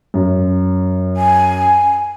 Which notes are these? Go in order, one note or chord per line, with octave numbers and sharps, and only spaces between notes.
F#2
G#5